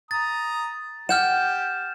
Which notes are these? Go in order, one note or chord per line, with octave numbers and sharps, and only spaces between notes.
A#5 D#6 A6
G4 F#5 F6 G6 E7